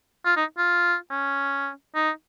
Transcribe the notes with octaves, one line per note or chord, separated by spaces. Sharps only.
F4
D#4
F4
C#4
D#4